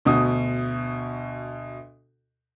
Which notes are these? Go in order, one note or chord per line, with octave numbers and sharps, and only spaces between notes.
D2 B2 D#6